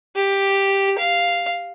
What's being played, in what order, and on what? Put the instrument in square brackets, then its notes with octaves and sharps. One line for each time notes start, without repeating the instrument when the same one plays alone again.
[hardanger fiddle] G4
F5